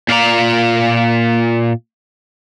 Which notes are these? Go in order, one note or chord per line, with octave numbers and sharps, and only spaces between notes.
A#2 F4 D5 A#5